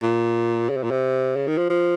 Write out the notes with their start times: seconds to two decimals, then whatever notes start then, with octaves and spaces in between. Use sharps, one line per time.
0.02 A#2
0.70 C#3
0.76 C3
0.83 A#2
0.91 C3
1.36 C#3
1.47 D#3
1.58 F3
1.70 F3